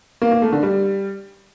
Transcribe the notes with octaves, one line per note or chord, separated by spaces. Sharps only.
A#3
A#3
A3
D3
G3